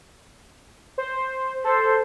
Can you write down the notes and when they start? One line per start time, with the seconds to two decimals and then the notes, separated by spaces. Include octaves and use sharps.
0.98 C5
1.64 A4 C5